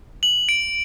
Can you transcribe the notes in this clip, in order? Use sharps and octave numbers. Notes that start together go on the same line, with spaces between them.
F#7
D7